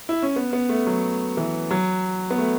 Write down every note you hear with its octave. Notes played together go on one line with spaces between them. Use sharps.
E4
C#4
B3
B3
A3
F#3
E3
F#3
B3
A3